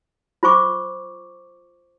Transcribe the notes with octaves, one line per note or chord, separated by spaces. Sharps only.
F4 C5 C#6 D6